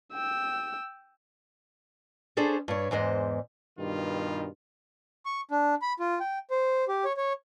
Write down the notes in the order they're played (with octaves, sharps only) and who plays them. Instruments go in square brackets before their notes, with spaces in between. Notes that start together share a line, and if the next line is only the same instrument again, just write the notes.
[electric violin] G5 E6
[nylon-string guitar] C#4 D4 G#4 A4 C5
G2 C#5
E2 G#2 C5 D#5
[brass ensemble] G2 B2 D#3 G3 F4
[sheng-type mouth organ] C#6
D4
B5
F4
G5
C5
G4
C#5
C#5